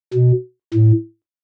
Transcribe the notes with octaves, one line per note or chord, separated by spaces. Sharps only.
B2
A2